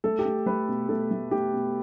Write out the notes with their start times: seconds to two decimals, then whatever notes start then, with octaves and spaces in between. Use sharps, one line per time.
0.04 A3 A4
0.19 G4
0.26 A3
0.46 A3 B4
0.69 B2
0.89 A3 A4
1.11 A3
1.31 A3 G4
1.53 B2